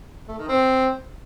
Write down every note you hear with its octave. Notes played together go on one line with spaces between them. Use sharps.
A3
D#3
C4